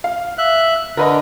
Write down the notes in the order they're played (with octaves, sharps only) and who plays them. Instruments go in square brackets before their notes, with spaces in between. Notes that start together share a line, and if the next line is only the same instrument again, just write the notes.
[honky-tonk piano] F5
[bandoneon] E5 F#6
[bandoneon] D3 [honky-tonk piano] A#4 B4 D#5